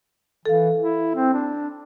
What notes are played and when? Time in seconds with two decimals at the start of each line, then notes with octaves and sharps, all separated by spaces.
0.45 E3 A4 F5
0.80 E4
1.15 C4
1.33 D4